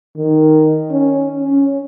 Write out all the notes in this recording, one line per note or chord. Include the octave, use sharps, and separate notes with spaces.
D#3
C#4
C#4